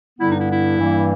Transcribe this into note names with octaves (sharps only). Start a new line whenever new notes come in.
G2 D3 G3 B3 E4
D#4
E4
E4
G2 E3 G3 A#3